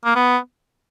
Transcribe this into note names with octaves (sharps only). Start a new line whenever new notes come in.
A#3
B3